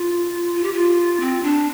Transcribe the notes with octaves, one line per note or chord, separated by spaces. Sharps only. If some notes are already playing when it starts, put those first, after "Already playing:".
Already playing: F4
F4
G4
F4
C4
D4